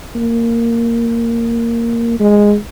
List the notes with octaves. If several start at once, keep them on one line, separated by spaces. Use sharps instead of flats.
A#3
G#3